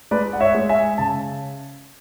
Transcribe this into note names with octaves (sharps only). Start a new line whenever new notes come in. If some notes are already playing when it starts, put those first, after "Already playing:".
G#3 B4 D5
F#5
C#5 E5
G#3
E5 G#5
C#3 A5